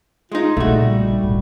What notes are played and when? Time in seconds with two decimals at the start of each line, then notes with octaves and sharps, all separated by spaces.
0.32 G#3 D#4 F4
0.57 A#1 C#3 G3 A3 F#4
1.23 A2 F#3